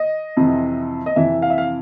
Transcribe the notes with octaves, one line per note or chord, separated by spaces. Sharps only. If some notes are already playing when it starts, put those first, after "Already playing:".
Already playing: D#5
F2 C3 E3
D#5
F2 C3 E3 E5
F5
E5
F5